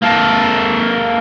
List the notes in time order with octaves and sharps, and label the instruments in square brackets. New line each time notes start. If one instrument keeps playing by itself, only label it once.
[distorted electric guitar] A#3 A4